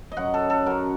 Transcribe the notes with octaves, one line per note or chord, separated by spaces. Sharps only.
D#5
F#2 F#3 F#5
A4
A4
F#2 F#3 A#4